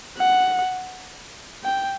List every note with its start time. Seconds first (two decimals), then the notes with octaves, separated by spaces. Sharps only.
0.18 F#5
1.64 G5